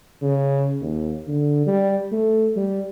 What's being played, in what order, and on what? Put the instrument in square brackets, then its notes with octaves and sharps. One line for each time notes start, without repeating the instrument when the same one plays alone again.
[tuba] C#3
D#2
D3
G3
A3
G3